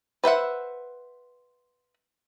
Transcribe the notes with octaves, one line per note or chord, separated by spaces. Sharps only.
B4 C5 E5 F#5